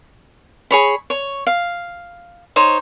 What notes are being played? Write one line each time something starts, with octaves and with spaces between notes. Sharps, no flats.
G#4 C#5 B5
C#5
F5
D#4 C5 C#5